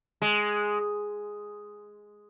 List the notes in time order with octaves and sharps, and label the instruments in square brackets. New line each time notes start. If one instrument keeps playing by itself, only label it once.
[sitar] G#3